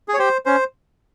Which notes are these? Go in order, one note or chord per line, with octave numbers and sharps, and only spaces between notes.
G#4
C#5
G4 C5
C#4 C5